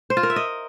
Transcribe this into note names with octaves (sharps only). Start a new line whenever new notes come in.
C5
F4
A#4
E5
D#5